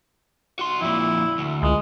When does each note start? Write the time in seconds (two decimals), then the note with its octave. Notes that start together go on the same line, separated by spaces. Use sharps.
0.59 F#4 C6
0.81 F2 A#2 E4
1.38 D2
1.62 C#2 G#3